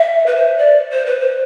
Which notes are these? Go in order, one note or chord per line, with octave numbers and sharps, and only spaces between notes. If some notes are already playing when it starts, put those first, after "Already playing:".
Already playing: E5
B4
C5
D5
C5
B4
C5